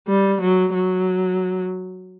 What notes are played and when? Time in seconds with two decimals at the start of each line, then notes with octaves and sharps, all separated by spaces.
0.08 G3
0.41 F#3
0.74 F#3